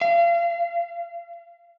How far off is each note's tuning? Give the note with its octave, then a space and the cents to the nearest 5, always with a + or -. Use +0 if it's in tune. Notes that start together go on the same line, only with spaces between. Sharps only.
F5 -35